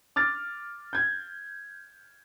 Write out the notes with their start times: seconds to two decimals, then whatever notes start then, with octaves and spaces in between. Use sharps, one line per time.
0.16 D6 F6 A6
0.93 G6 G#6